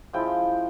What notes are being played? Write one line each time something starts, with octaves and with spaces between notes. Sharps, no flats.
F3 G#3 C#4 E4 G5